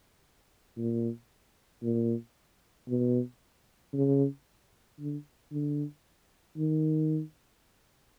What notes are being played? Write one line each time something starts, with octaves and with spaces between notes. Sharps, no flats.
A#2
A#2
B2
C#3
D3
D3
D#3